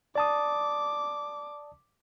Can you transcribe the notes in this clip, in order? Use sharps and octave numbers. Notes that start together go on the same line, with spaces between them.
D5 A5 D6 D#6